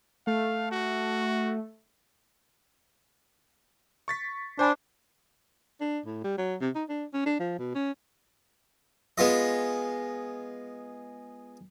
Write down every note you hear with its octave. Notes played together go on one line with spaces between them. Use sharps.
A3 F5
F#4
C#6 A6 B6
D4 C5 G#5 B5
D4
A2
G3
F#3
C3
D#4
D4
C#4
D4
F3
B2
C#4
G#3 B3 F4 D#5